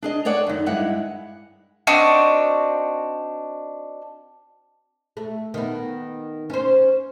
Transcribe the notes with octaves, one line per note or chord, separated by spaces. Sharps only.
D4 G#4 D#5
G#4 A4 C#5 D5 F#5
F#2 D#3
G2 G#3 E4 F#5 G#5
C4 D4 D#4 F#4
A3
D#3 B3
C#4 C5